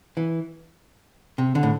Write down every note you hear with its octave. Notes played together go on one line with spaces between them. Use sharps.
E3
C3
D3
A2